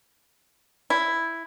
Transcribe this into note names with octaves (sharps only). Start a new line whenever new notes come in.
E4